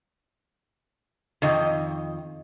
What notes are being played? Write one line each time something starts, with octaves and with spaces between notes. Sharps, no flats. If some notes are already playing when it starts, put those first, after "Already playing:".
F2 D#3 D#5